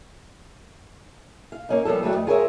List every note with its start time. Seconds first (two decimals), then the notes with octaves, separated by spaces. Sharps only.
1.52 F5
1.69 A#3 C#4 D#4
1.85 F3 G3 A#3 B3 A4
2.03 D2 G3 A3 F#4 F#5
2.15 F2
2.27 F4 G#4 A#4 C#5 D5 E5